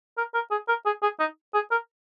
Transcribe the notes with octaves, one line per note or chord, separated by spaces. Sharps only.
A#4
A#4
G#4
A#4
G#4
G#4
D#4
G#4
A#4